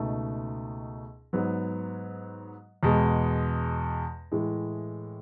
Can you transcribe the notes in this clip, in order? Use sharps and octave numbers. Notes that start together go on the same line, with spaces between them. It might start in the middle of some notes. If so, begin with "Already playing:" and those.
Already playing: C#2 B2 A3 D#4
G#2 F#3 B3
E2 B2 G#3
A2 E3 G#3